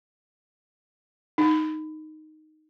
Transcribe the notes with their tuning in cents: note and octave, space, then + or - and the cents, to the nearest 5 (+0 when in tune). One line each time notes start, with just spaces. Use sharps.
D#4 -5